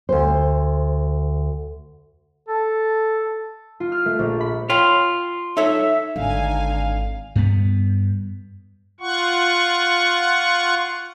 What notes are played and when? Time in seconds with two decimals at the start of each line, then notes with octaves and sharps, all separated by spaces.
0.09 D2 C5
2.48 A4
3.80 F4
3.92 F6
4.06 A3
4.19 A#1
4.41 B5
4.70 F4 C#5 G5 B5
5.57 D#4 A4 C#5 E5
6.16 G#1 D3 D#4 F5 G#5
7.36 G2 B3
9.00 F4 F#5 C#6